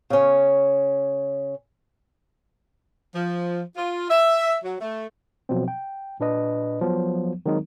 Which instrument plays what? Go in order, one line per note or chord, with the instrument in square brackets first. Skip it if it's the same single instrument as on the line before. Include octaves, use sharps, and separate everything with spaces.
[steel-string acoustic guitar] C#3 C#4
[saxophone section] F3
F4
E5
F#3
A3
[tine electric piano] B2 F3 F#3 C4
G5
A#2 D4 B4 D#5
F3 F#3 B3
D#3 F#3 G#3 C4 D#4